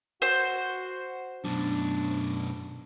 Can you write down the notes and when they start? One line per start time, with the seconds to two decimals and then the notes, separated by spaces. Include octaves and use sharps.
0.22 F#4 C5
1.44 F#2 B2 D4